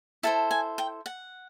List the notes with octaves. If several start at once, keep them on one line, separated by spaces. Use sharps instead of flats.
E4 A4 C5 A5
G#5
G5
F#5